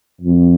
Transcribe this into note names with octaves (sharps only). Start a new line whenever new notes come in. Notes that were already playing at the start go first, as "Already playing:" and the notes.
F2